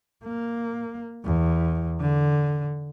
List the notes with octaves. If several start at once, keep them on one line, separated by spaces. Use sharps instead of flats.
A#3
E2
D3